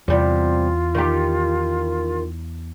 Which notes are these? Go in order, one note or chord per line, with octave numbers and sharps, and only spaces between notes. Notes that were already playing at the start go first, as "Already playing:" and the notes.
E2 C3 G3 F4
D#3 G4